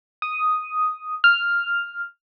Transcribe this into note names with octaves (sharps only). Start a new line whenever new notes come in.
D#6
F6